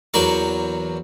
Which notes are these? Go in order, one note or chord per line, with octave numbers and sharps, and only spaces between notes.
E2 F#3 A#3 D5 C#6